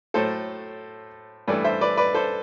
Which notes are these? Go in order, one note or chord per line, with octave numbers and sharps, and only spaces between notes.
A2 F#3 A3 A4 C5
G2 E3 A3 B4 D5
C5 E5
B4 D5
B4 D5
A4 C5